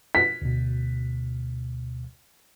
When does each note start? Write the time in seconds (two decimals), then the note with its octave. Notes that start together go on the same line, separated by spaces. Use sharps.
0.15 B6
0.42 D2 B2